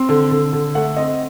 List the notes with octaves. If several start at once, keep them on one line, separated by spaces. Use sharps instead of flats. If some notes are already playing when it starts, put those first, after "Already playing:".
Already playing: C4
D3
D3
D3
A3 F#5
C4 D#5